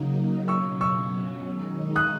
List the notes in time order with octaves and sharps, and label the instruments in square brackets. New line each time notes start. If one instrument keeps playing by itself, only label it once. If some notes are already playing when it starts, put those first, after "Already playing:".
Already playing: [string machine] C#3 F#3 A#3 D#4
[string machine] B2 F#3 C#4 [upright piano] C#6 E6
[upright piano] C#6 E6
[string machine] D#3 G#3 D#4
[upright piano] D#6 F#6